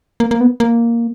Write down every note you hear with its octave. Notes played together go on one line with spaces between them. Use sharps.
A#3
A#3
B3
A#3